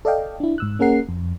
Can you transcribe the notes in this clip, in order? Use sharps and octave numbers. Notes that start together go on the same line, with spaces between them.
A4 D5 D#5 F5 G5
D4 E4
G#2 E6 F#6
A#3 C#4 G#4 A#4 F#5 C7
F2